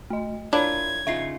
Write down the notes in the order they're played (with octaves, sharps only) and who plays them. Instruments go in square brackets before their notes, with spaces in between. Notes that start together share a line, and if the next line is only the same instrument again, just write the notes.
[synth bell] A3 D#5
[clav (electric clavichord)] D4 [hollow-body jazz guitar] E4 F4 A#4 [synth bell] C#5 B5 [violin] G#6
[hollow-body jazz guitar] C#3 D#4 F4 [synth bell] E5 C7